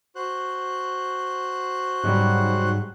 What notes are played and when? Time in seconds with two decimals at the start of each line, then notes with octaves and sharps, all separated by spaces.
0.15 F#4 C5 F#6
2.03 G#2 C#3 F#3 G3 F#5